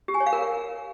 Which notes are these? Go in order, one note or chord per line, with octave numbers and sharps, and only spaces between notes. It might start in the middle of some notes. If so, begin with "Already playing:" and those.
G4
G#5
C#5
F5
A#4